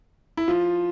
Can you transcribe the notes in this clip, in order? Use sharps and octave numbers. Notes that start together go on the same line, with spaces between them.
E4
F3 F4